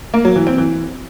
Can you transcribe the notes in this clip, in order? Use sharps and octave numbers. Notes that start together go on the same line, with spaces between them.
A#3
F#3
E3
C4
E3